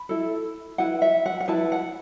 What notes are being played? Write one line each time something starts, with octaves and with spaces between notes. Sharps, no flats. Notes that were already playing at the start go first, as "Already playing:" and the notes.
Already playing: B5
E4 A4
E4 B4 F#5
E5
F#5
F#5
E4 B4 A5
F#5